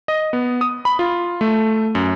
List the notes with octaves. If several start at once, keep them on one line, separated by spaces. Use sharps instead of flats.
D#5
B3
D#6
B5
F4
A3
F#2